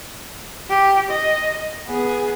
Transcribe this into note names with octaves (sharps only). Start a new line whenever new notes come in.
G4
D#5
B3 G#4